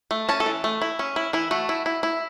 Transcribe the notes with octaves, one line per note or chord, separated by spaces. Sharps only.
A3
C#4 A5
A4
E3
A3
E4
C#4
E4
E3 E4
A3 F#4
E4
E4
E4